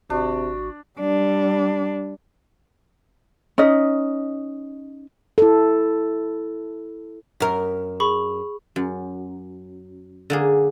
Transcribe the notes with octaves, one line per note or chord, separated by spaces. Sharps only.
G#1 C3 D4 F#4
G3 D4
C#4 D#4 D#5
E4 A4
F#2 A#4
G#4 B5 C#6
F#2
D3 A#3 G#4